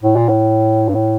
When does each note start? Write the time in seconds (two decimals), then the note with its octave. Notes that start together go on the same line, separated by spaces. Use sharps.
0.03 A2
0.16 A#2
0.29 A2
0.89 G2
0.95 A2